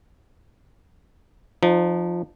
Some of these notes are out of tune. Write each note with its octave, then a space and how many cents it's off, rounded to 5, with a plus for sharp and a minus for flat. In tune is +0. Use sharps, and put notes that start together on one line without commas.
F3 +0 D#4 -35